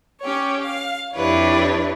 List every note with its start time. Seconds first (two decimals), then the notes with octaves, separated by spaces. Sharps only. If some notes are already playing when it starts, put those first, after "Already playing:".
0.22 C#4 G4 C#5
0.62 F5
1.14 F2 D4 E4 G4 B4 C#5